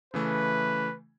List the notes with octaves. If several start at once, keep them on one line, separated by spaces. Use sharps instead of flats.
C#3 E3 A3 B4